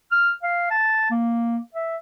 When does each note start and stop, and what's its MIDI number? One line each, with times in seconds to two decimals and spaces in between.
0.12 0.31 89
0.43 0.67 77
0.70 1.06 81
1.10 1.58 58
1.74 1.97 76